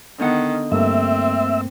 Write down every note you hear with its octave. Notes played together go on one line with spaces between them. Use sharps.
D3 D#3 B3 F#5
G2 A3 A#3 C4 E5